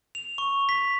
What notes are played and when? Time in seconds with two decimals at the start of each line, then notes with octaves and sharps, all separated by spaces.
0.15 F7
0.38 C#6
0.69 B6